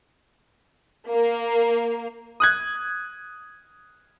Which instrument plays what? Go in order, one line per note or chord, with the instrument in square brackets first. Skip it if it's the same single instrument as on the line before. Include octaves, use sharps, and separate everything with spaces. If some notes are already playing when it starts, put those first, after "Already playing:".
[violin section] A#3
[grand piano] D#6 F#6 G#6